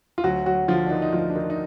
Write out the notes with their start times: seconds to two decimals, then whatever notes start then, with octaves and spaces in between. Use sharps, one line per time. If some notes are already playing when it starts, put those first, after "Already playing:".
0.18 F4
0.24 D2 F#3 F#4
0.46 F#3 F#4
0.68 D3 F3 F4
0.87 D4
0.90 D#3 D#4
1.02 D#4
1.13 D2 F3 F4
1.30 D4
1.35 D#3 D#4
1.50 D#4